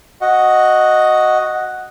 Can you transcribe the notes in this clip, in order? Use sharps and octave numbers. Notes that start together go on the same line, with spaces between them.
F#4 D#5 F#5